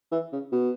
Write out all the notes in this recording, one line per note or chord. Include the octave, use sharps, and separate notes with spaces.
E3
C#3
B2